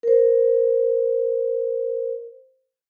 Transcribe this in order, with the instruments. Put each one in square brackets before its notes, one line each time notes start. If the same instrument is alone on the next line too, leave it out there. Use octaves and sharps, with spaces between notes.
[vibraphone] A#4 C5